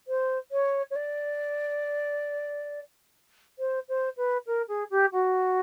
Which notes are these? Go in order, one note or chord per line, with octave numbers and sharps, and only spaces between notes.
C5
C#5
C#5
D5
C5
C5
B4
A#4
G#4
G4
F#4